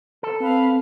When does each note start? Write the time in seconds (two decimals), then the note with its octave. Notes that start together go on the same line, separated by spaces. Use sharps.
0.23 A4
0.40 C4 B4 F5